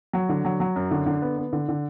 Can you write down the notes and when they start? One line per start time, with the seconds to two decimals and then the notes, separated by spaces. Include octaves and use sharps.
0.13 F#3
0.29 D3
0.45 F#3
0.60 F#3
0.76 F#2
0.91 D3
1.06 D3
1.22 B3
1.38 B3
1.53 D3
1.68 D3